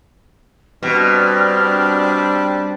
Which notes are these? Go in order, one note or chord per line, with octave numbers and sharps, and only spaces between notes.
B2 G3 C4 D4 F6